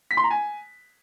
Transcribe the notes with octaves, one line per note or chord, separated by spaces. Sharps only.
B6
C6
A#5
G#5